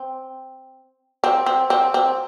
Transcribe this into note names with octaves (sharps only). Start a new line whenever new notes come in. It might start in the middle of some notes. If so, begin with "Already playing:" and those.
Already playing: C4
C4
C4
C4
C4